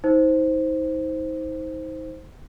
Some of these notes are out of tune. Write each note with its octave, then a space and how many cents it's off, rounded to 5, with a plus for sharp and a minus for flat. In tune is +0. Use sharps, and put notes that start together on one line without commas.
D#4 +35 C5 +0